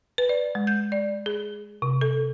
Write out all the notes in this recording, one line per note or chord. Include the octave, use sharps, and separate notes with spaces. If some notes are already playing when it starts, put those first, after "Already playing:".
B4
D5
G#3
G6
D5
G#4
C3
A4